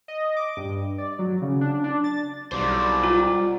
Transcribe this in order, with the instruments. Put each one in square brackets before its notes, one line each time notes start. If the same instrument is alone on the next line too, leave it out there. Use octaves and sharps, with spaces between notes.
[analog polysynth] D#5
D6
G2
D5
F#3
C#3
D4
D4
A6
[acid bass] B1 [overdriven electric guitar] G3 C5 [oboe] D5
[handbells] F4